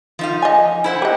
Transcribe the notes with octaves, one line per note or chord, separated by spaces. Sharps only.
F3 D#4 F5
D#5 G#5
E4 C5 F#5
G4 D#5